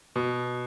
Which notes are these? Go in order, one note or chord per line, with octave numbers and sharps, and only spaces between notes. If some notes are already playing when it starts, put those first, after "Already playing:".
B2